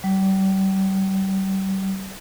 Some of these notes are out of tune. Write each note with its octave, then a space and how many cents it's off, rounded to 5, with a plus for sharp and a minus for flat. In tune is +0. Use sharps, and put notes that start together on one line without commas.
G3 -35